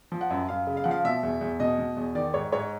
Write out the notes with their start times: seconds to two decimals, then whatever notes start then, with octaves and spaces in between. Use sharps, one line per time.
0.12 F3
0.21 F#5
0.30 F#2
0.48 F#2 F5
0.67 C#3
0.77 F5
0.84 F3 F#5
0.91 F5
1.04 B2 E5
1.23 E2
1.41 E2
1.60 B2 D#5
1.79 B2
1.97 E2
2.15 D#3 D5
2.34 G#2 C#5
2.52 G#2 C#5